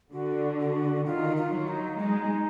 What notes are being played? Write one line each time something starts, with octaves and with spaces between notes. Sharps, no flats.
D3 F#4
F#4
D#3 F4
F4
F#3
D#4
G#3 D#4